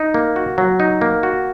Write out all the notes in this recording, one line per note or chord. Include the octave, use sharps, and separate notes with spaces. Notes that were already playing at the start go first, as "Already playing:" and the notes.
Already playing: D#4
A#3
F#4
F#3
D#4
A#3
F#4